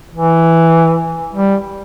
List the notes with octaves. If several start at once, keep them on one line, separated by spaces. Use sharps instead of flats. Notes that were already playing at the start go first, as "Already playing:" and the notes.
E3
G3